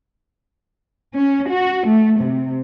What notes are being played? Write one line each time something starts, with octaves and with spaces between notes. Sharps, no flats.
C#4
F#4
A3
C3